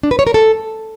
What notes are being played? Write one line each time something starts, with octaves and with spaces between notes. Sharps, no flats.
D4
B4
C#5
A#4
A4